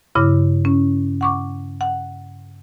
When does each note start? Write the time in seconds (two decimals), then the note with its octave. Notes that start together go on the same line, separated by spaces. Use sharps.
0.15 G2 C#3 E4 D6
0.65 C#4
1.21 F#5 C#6 D6
1.81 F#5